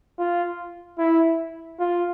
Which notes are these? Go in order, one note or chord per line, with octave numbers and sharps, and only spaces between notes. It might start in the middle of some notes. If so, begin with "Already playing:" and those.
F4
E4
F4